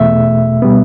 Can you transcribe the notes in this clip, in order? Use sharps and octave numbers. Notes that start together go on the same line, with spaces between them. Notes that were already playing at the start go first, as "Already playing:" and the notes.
Already playing: E2 B2 A3 E5
B2 G3 B3